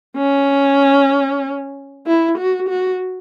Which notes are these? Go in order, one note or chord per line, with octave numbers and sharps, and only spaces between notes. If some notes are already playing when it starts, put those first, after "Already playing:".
C#4
E4
F#4
F#4